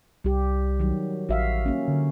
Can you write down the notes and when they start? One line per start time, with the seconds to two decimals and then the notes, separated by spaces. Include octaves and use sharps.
0.24 C2 G3 G4
0.80 D#3 F#3
1.29 A1 F#4 E5 F5
1.66 A#3 C#4
1.88 D3